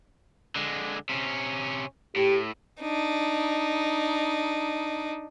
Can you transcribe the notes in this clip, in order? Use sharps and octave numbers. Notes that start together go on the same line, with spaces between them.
D3 G#3
C3 C#4
A2 G4
D4 D#4